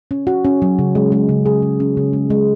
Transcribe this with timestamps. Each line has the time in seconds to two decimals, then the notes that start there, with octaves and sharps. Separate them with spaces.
0.11 C#4
0.27 F#4
0.45 C#4
0.62 F#3
0.79 C#3
0.95 G#3
1.12 G#3
1.29 C#3
1.46 G#4
1.62 G#3
1.80 C#4
1.97 C#3
2.13 G#3
2.30 G#3